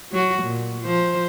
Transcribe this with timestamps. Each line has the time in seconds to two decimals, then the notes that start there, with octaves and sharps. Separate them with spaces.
0.12 F#3 F#4
0.43 A#2
0.82 F3 C5